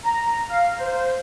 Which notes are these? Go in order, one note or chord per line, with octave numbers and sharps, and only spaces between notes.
A#5
F5
C5